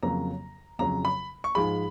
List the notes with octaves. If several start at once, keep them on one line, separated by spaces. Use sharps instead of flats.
F2 C#3 F#3 A#3 A#5
F2 C#3 F#3 A#5
B5
C#6
G#2 F3 G#3 B5